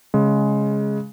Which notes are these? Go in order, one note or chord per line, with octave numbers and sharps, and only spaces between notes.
C#3 G#3